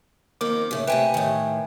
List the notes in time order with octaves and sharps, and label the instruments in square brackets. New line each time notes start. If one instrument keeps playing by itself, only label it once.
[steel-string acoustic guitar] F2 D#3 A#3 [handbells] D6
[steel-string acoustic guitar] A2 C#3
[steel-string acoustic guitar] C3 A3 E5 [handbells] B4 G5 G#5
[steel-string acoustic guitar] A2 D#3